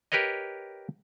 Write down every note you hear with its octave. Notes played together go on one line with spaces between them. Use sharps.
G4 A#4 B4 C#5 D#5